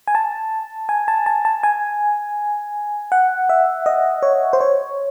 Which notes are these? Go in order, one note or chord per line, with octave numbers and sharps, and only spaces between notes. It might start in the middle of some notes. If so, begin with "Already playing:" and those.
G#5
A5
G#5
A5
A5
A5
G#5
F#5
E5
D#5
C#5
C5
C#5